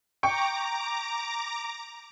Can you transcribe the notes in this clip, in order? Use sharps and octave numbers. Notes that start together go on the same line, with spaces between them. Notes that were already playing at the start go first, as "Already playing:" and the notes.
G5 A#5 C#6 D6 C#7